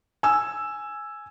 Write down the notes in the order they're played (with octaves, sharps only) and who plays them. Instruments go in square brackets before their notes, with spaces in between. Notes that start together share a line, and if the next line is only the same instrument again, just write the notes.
[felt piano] G#5 E6